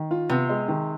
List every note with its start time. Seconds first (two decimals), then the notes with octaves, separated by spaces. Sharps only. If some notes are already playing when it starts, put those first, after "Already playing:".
Already playing: D#3
0.11 F4
0.29 C3 B3
0.49 G#3
0.68 D#3